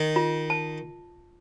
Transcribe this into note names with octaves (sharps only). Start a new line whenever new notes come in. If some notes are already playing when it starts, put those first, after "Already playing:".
Already playing: D#3 D#5
F4
A5